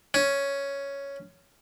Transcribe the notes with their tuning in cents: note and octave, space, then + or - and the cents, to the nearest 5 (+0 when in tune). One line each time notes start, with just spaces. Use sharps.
C#4 +5